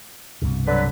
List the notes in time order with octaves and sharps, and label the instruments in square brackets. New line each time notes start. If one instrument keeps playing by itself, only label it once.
[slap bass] C2 G2 B2
[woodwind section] D3 F#3 B4